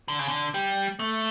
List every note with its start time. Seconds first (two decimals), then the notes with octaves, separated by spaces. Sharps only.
0.08 D3
0.19 C#3
0.28 D3
0.54 G3
0.99 A3